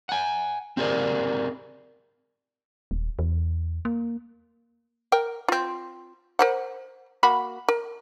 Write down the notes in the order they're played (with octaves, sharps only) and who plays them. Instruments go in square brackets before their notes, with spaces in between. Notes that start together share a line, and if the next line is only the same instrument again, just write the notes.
[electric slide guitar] F#5 G#5
C4 G4 G#4 A#4 D5
[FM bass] D#1
E2
A#3
[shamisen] A#4 G5
C4 F4
A#4 C5 F#5
A#3 F#4 B5
A#4